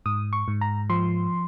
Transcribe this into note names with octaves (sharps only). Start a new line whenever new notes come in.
G#2 D#6
C#6
G#2
A#5
F3 C6